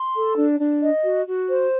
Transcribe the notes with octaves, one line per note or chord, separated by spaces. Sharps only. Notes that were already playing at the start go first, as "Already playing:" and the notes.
Already playing: C6
A4
D4
D4
D#5
F#4
F#4
C5